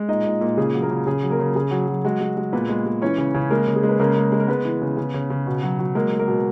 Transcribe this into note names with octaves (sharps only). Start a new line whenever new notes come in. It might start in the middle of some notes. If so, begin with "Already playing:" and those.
Already playing: G#3
A#2 D#4 D#5
A#2
A#2
C#3 G#4
F#3
A#3 A#4
C#3
C#3 G#4
F#3
A#3 A#4
C#3
C#3 G#4
F#3
F#3
G#3 F#4
G#3
G#3
A#2 B3 B4
G#3
G#3
E3 C#4 C#5
C#3
C#3
G#3 A#3 A#4
C#3
G#4
G#3
B4
C#3 A#3 A#4
G#3
G#3
A#4
G#3 B3 B4
E3
C#3
C#3
C#3
C#3
B2
F#3
F#3
G#3 A#3 A#4
G#3
A#3 A#4
B2